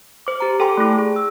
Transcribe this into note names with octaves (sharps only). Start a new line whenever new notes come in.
C5 D6
G4 A#5
A4 G5 G#5 C6 D6
A3 E4
G#4
E6